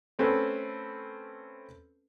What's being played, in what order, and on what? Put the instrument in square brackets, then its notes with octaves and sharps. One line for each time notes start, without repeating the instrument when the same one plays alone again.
[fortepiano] A3 C4 C#4 A4 B4